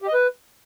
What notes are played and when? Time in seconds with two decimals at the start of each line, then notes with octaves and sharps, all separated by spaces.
0.02 G4
0.08 D#5
0.14 B4